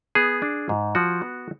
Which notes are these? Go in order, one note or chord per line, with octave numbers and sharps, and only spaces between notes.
B3 G#4
D4
G#2
F3 F#4
B3